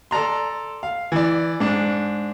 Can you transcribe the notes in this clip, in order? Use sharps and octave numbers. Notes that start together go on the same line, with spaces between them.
A4 D5 A#5 C6
F5
E3 D5
G#2 D4